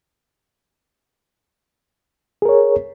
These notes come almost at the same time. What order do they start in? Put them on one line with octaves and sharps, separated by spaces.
G#4 A#4 C#5